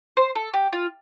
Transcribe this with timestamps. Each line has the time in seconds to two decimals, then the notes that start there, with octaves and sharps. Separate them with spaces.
0.17 C5
0.35 A4
0.54 G4
0.73 F4